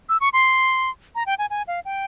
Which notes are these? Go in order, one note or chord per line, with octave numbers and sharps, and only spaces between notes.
E6
C#6
C6
A#5
G5
G#5
G#5
F5
G5